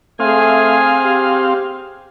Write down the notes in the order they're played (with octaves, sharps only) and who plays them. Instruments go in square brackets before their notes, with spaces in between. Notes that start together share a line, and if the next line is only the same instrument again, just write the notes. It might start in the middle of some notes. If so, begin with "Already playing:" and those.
[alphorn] A3 [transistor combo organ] C4 F5 [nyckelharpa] G#4 G#5
[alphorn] G4